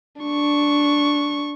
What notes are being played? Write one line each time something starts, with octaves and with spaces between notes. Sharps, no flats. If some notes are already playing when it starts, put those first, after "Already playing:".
D4 C#6